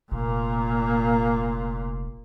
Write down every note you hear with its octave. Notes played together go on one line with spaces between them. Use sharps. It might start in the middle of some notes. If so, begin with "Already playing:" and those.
F1 A#2 A#3